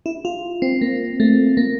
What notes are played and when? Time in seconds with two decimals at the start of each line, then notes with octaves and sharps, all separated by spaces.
0.06 E4
0.25 F4
0.62 C4
0.81 A#3
1.20 A3
1.57 A#3